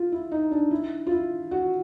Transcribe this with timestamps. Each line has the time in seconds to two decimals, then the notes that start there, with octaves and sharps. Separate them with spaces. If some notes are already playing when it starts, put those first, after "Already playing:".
Already playing: F4
0.12 E4
0.31 D#4
0.51 D4
0.71 E4
1.07 F4
1.11 E4
1.51 F#4